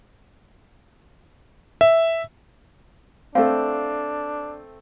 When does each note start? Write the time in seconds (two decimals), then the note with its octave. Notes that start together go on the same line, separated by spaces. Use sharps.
1.81 E5
3.35 A3 C4 D4 F5